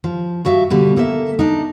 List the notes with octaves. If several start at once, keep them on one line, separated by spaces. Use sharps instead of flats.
F3
G2 F#4 E5 F5
B2 D3 G3
A#3 A4 A#4 E5
D4 D#4